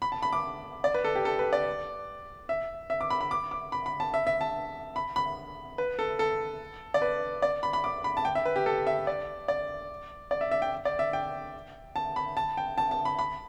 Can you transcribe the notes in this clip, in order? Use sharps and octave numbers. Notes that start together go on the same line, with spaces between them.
B5
A5
B5
D6
D5
B4
A4
G4
A4
B4
D5
E5
E5
D6
B5
B5
D6
D6
B5
B5
A5
E5
E5
A5
B5
B5
B4
A4
A4
D5
B4
D5
B5
B5
D6
B5
A5
G5
E5
B4
G4
A4
E5
D5
D5
D5
E5
E5
G5
D5
E5
G5
A5
B5
A5
G5
A5
A5
B5
B5